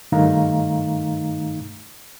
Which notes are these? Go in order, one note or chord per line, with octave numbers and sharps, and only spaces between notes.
G2 D#3 A3 D#4 F5 A#5